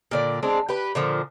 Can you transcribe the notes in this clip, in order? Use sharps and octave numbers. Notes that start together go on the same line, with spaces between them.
A#2 D3 D5
G#3 C4 D4
G4 B4
A#2 D3 F3